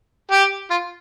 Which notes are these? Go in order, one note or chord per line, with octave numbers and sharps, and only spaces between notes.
G4
F4